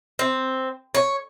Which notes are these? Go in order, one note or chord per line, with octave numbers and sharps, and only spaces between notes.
C4
C#5